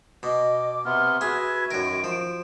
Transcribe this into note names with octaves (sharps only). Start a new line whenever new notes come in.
B2 D#5 D6
C3 B3 C6 F6
F#4 G#4 B4 E5 G#6
F#2 D#3 A#4 D7
F3